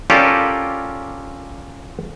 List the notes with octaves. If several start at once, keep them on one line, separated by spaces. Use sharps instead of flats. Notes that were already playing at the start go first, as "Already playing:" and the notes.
C#4 F4 G4 A4 A#4 D5